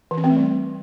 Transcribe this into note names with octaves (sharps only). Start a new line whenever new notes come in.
E3
C#4
C4
A3
G3